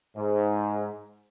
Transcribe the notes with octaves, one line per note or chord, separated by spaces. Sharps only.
G#2